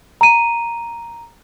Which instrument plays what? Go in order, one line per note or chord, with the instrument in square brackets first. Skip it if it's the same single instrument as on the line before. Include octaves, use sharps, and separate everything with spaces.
[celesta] A#5 D#7